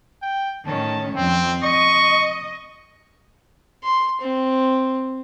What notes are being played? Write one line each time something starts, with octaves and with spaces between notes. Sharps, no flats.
G5
A2 D#3 C#4 A5
F2 C4
D#5 C#6
C6
C4